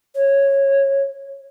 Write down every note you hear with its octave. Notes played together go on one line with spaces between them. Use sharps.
C#5